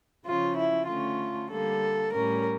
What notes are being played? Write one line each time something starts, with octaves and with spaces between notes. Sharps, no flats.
C#3 F3 C#4 F4
E4
D3 A3 C#4 F4
D3 G3 A#3 A4
A2 G3 C#4 A#4